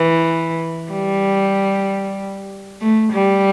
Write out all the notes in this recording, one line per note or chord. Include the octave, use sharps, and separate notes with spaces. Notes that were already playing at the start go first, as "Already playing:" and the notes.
Already playing: E3
G3
A3
G3